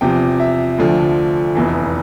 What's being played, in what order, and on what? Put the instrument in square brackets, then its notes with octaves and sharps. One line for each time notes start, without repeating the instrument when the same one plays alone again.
[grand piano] E2 C3 F3 G5
E5
D2 D3 F3
F1 E2 E3